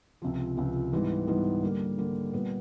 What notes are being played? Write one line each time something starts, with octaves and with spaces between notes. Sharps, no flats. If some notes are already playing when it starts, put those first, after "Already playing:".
C#2 C3 F3
C#2 C3 F3
G#2 E3 G3 B3
G#2 E3 G3 B3
D3 G3 A#3
D3 G3 A#3
A#2 G3 B3